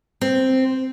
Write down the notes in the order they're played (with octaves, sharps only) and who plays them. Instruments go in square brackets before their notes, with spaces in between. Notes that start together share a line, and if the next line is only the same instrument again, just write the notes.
[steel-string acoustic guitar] C4